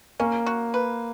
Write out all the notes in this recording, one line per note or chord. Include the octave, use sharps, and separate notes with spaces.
A#3 C#4
F#4
B4